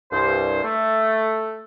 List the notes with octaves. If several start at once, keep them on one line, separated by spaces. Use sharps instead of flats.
C2 G2 C5
A3